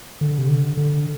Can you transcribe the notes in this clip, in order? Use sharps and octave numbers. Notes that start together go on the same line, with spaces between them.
D3
C3
D3
D3